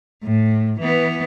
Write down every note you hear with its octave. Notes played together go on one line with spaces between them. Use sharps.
A2
E3 B3